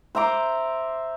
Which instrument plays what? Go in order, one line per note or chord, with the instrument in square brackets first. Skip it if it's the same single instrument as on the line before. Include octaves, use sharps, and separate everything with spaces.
[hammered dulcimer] C5 E5 A#5 D6